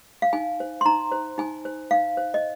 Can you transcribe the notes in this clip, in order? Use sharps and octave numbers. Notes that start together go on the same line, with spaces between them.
F5
D#4 G#5
C5
C6
D#4 A#5
C5
D#4 G#5
C5
D#4 F5
C5
D#5